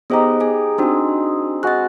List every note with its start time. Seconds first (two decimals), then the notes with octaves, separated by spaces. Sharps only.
0.10 B3 D#4 G4 G#4 C5 D#5
0.40 G#4 G#5
0.78 C4 D4 D#4 F#4 G#4
1.63 G#3 F#4 F#6 A6